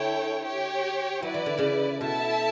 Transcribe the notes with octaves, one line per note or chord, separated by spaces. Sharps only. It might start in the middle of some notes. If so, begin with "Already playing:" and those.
Already playing: D3 E4 A4 C#5 G5
G4 C#5 G5
F#3 E4 B4 D5
E3
D3
C#3 E3
B2 E4 A4 E5 A5